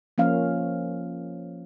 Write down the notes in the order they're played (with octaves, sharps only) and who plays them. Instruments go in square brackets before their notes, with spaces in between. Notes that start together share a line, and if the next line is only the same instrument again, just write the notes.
[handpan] F3 A#3 C#4 F5